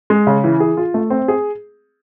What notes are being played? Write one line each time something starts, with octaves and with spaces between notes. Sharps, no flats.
G#3
C#3
E3
G#4
F4
A3
C4
G#4